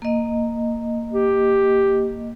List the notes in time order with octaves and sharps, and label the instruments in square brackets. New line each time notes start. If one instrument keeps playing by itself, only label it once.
[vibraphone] A#3 D#5
[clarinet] G4